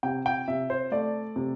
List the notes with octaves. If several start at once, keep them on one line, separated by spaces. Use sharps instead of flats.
C3 G5
G5
C3 E5
C5
A3 D5
C3